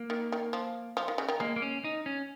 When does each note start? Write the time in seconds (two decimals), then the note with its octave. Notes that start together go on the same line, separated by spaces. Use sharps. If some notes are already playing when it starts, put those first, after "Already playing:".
Already playing: A#3
0.10 D#3
0.32 D#3
0.53 F3
0.97 F3
1.08 D#3
1.18 C#3
1.28 D#3
1.40 G#3 A#3
1.56 A#3
1.62 C#4
1.85 D#4
2.06 C#4